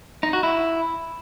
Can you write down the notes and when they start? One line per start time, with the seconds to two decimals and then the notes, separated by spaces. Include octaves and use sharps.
0.23 D#4
0.33 F#4
0.43 E4